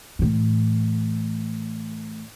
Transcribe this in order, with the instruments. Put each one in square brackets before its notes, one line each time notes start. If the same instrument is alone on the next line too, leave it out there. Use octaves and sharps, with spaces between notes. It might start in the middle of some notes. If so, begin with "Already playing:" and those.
[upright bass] A2 E3